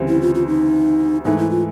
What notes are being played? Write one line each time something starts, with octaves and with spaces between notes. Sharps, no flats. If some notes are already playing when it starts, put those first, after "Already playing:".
Already playing: D2 C#3 E3 G3 C4
E4
F4
F4
D#4
G#2 E3 A3 D#4
E4
F4